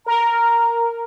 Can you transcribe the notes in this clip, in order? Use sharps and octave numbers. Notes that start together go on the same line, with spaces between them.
A#4 A#5